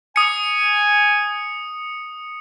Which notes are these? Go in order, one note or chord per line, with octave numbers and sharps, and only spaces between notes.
G#5 D#6 C#7